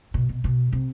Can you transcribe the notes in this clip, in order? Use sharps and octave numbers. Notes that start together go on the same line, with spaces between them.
B2
B2
B2
C3